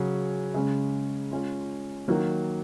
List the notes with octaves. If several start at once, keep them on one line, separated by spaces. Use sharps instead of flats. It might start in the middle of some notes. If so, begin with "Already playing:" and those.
Already playing: C#3 F#3 C#4 G#4
C#3 G#3 C#4
G#3 C#4 F4
D#3 F#3 A#3